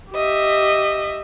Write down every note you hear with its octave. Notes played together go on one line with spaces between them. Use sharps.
G4 D#5 E5